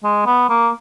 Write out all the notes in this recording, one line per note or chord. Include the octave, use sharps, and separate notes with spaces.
G#3
B3
A#3